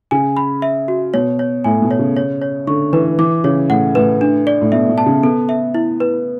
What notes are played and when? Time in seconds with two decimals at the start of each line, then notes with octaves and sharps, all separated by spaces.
0.11 C#3 G#5
0.37 B5
0.62 E5
0.88 F#4
1.14 B2 C#5
1.39 C#5
1.64 A2 G#5
1.82 B2
1.91 C#5
1.99 C#3
2.17 C#5
2.42 C#5
2.67 D3 C#6
2.93 E3 B4
3.19 E3 D6
3.44 C#3 C#5
3.69 A2 F#5
3.95 A2 B4
4.21 D4
4.47 D5
4.61 A2
4.72 B2 E5
4.89 B2
4.98 A5
5.06 C#3
5.23 B3 A4
5.49 E5
5.75 E4
6.00 B4